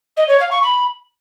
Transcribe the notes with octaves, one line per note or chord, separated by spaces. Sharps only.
D#5
C#5
F5
C#6
B5